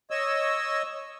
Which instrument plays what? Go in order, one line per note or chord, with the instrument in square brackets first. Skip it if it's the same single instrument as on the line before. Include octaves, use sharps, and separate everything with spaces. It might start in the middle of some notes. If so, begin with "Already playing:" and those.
[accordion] C#5 D#5 E6